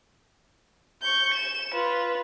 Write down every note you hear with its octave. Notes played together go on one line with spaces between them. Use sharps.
C#6 G6
E7
F4 B4